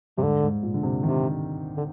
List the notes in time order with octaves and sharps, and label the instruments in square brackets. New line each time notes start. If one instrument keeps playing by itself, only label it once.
[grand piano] G2 [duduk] C3
[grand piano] G#2 [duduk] D3
[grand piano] G#2
A#2
D3
C3
[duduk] C3 [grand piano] D#3
[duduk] D3